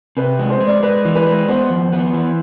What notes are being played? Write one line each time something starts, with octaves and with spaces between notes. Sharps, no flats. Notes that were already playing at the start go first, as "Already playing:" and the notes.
C3 B4
G#3
C5
G#3
D5
G#3 B4
E3
B4
G#3
B3 C5
F2
B3
E3